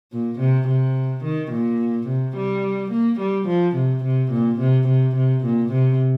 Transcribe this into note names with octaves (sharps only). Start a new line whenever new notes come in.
A#2
C3
C3
D#3
A#2
C3
G3
A#3
G3
F3
C3
C3
A#2
C3
C3
C3
A#2
C3